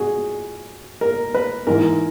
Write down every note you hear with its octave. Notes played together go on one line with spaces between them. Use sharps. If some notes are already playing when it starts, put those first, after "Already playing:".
Already playing: F#4 G#4
A#4
B4
G#2 E3 A#4